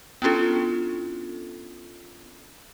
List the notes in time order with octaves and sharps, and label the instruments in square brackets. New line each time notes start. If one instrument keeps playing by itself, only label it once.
[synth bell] B3 C#4 D4 E4 F4 A4